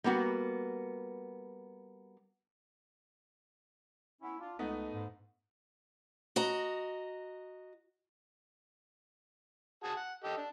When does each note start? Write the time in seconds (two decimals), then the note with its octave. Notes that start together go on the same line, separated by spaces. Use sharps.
0.04 G3 A#3 B3 F#4
4.22 B3 C#4 E4
4.39 D4 F4
4.59 C#2 A3 B3 D#4
4.92 G#2
6.36 F#4 D#5 A#5
9.84 F#4 G#4 A5
9.96 F#5
10.24 G4 A4 D#5
10.37 D4